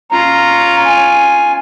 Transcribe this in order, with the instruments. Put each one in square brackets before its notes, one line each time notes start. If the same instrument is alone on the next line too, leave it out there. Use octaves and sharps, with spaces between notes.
[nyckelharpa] C#4 F4 [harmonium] A#5
[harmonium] G#5